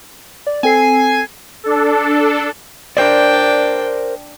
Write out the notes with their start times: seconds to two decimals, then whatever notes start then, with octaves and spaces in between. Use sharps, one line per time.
0.47 D5
0.63 C4 A4 G#5 C7
1.64 D4 A4
2.97 D4 A#4 C5 D5 G5